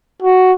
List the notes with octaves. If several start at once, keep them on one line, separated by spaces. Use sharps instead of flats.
F#4